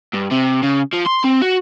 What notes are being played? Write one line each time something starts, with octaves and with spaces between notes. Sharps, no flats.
G2
C3
C#3
F3
C6
C4
F#4